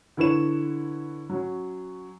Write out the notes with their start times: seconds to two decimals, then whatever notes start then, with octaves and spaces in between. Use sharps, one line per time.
0.17 D3 E4 B4 C#5 E7
1.30 F#3 C#4